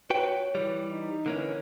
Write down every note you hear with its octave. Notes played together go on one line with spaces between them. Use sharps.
F#4 B4 C#5 G5
E3 G3
D#4
D3 E3 A#3 C#4